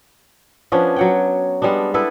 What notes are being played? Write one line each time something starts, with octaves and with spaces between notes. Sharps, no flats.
F3 B3 C#4 D4
F#3 F#5 G5
G3 G#3 B3 D4
B3 E4 A4 B4